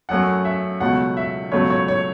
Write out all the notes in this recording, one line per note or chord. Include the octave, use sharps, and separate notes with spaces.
F#2 F#3 A3 F#5
E5
C#2 B2 F#3 A3 F#5
E5
C#2 B2 F#3 A3 C#5
C#5
C#5